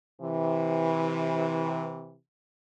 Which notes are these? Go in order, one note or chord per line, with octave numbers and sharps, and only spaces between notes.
C3 E3